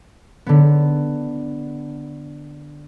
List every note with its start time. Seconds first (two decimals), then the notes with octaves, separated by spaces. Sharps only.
0.46 D3 B3